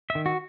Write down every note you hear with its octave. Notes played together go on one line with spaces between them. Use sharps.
E5
D#3
F#4